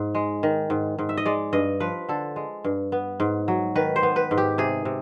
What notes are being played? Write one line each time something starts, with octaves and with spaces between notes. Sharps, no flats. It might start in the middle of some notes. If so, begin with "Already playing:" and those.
Already playing: G#2
G#3
D#3
G#2
G#2
E5
D#5
G#3 D5
G2 D#5
F3 B4
D3 A4
G#3
G2
B3
G#2
F#3
D#3 B4
C5
B3
B4
G#2
G4
C3 G#4
C3